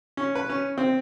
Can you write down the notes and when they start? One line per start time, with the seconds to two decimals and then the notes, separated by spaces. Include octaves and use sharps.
0.17 C#4
0.35 B4
0.49 C#4
0.78 C4